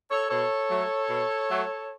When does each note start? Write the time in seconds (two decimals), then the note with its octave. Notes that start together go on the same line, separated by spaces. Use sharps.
0.10 A4 C#5
0.29 B2 A4 C#5
0.69 F#3 A3
1.08 B2
1.47 F#3 A3